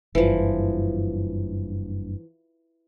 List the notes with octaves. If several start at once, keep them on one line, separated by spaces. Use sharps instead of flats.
F#1 G2 E3 F3